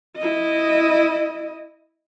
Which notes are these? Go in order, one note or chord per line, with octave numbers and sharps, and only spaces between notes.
E4 D#5